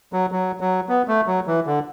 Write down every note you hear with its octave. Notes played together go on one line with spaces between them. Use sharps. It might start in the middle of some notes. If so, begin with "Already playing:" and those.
F#3
F#3
F#3
B3
A3
F#3
E3
D3